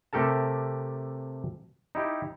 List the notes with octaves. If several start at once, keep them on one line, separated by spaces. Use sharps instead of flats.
C3 A3 G4 A4 A#4 A5
D#4 E4 G4